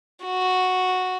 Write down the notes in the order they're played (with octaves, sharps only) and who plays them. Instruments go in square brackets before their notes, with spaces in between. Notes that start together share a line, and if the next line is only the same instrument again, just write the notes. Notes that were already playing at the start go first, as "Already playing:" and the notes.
[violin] F#4